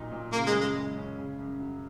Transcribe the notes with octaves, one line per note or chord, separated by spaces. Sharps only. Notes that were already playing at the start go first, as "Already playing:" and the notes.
Already playing: A#2 F#3 D#4
A#2
C#3 A#3
G#3
F#2
G#3
G#3
C#4
C#3
F#2
F#3